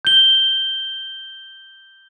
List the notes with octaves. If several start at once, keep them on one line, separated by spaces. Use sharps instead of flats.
G6 G7